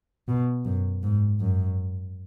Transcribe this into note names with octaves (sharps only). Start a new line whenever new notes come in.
B2
F#2
G#2
F#2